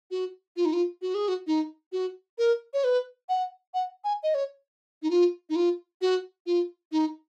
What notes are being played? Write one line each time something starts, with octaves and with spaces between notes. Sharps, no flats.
F#4
F4
D#4
F4
F#4
G#4
F#4
D#4
F#4
A#4
C#5
B4
F#5
F#5
G#5
D#5
C#5
D#4
F4
D#4
F4
F#4
F4
D#4